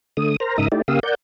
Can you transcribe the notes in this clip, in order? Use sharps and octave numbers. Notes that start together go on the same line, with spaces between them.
D3 A3 D#6
A#4 C5 A#5
G#2 C#3 D#4 A#4 E5 D#6
A3 D#4 E4 G4 D5
C#3 A#3 G4 F5 D#6 E6
A#4 D5 F#5 G6